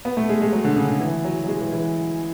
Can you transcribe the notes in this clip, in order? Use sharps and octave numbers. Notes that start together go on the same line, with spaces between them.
B3
A3
G#3
G#3
F#3
D3
C#3
D3
E3
F#3
F#3
G#3
E3
E3